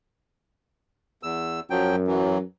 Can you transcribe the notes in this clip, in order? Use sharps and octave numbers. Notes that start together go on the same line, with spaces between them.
E2 E6
F#2 F3 F#3 G5
E3 F#3